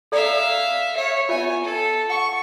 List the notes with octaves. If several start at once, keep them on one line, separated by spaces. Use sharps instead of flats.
A4 D5 E5 F5 A#5
C#5 E5
B3 F4 C#5 E5 G#5
A4
F#5 C#6